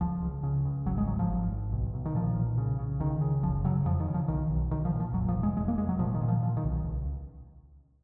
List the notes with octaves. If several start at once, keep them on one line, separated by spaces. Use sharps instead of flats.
C#2 F3
C#2
C#3
C#2
G#1 F#3
G#3
G#1 F#3
F3
G#1
G#1
B1
B1
D#3
A#2 F3
B1
C#3
C#3
C#2 D#3
C#3
F#1 F3
C#3 F#3
F2 F3
D#3
C#3
F3
B1 D#3
B1
B1 D#3
F3
A#2
F3
F1 F#3
F3
F1
G#3
F1 G#3
A#3
F1 G#3
F#3
A#2 F3
D#3
A#2
F3
A#2 F3
D#3
B1
C#2